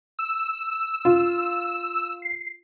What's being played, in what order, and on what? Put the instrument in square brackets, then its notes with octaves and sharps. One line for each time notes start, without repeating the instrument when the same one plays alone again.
[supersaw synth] E6
[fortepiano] F4
[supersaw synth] C7